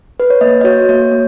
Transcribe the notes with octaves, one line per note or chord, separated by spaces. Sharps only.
B4
C#5
A#3 D#5
D#5
F#4 C#5
A#3 C#5
A#3